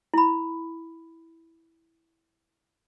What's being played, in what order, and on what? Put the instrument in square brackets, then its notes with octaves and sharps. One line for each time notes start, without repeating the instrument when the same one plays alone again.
[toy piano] E4 B5